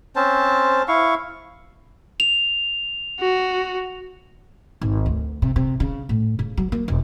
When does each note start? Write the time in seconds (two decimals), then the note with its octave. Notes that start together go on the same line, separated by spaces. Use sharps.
0.16 C4 C#4 C5 A5
0.88 E4 F5 C#6
2.20 F7
3.20 F#4
4.81 G#1
5.06 D2
5.42 C3
5.56 C3
5.80 C#3
6.09 A2
6.39 C#3
6.57 F#3
6.72 A#3
6.88 E1